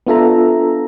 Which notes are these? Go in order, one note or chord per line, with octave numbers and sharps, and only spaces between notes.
B3 D4 F4 A4 E5 A#5